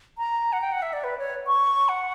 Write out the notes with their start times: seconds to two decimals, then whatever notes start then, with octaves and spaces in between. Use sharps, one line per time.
0.18 A#5
0.53 F#5
0.61 G5
0.72 F#5
0.82 E5
0.93 D5
1.04 B4
1.19 C#5
1.47 C#6
1.89 F#5